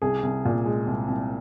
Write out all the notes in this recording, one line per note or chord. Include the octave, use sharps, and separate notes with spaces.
C2 G#4
C2
A#2
G#3
C2
C2